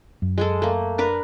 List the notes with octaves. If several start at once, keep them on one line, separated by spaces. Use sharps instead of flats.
F#2
G#3 G#4 A4
A3 A#3
D4 A#4 B4